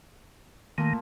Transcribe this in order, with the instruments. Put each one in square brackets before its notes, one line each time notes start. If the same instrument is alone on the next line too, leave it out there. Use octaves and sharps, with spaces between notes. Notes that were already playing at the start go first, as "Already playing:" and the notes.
[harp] A#2 A3 [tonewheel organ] D#3